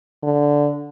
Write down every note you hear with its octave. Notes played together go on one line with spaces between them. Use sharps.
D3